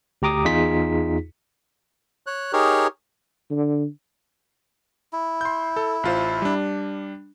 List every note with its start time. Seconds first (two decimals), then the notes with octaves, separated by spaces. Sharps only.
0.22 D2 G4 A#5 D6 D#6
0.45 E2 D#4 F4 G#4 B6
2.27 C#5 F#6
2.53 D#4 G4 G#4 A#4 C#5
3.51 D3
5.13 E4
5.41 C6 G6
5.76 A4
6.03 A1 F4 C5
6.42 G3 D4